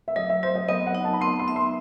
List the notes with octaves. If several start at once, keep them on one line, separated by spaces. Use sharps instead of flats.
E5
F#3 D#5
E5
F#3 C5
D#5
B3 D#5
F#5
D#4
A5
B5
B3 C6
C6
E5
C6